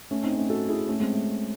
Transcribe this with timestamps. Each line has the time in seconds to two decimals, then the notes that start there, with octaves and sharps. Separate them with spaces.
0.11 A3 C#4
0.24 C4 D#4
0.36 A3 C#4
0.50 F#4 A4
0.68 E4 G#4
0.88 A3 C#4
1.00 G#3 C4
1.13 A3